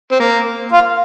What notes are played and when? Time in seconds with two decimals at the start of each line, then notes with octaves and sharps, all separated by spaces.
0.12 C4
0.20 A#3
0.72 F4